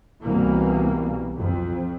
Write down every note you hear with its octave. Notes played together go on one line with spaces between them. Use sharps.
C2 B2 E3 A#3
F2